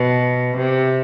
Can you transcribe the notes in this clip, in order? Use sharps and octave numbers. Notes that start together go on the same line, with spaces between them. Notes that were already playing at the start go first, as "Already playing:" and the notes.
Already playing: B2
C3